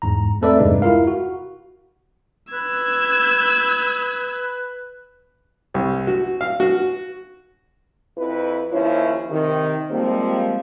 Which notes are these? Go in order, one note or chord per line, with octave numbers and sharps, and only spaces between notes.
E2 G#2 A#5
A3 C4 A4 B4 D5 E5
E2 G2 C3 G#3 D#4
E4 F4 A#4 F5
F#4
B4 E6 G#6
C2
F#4
F5
F#4
F2 E4 B4
D#2 F3 C#4 E4 C#5
C3 D#3
F3 G3 G#3 A#3 C4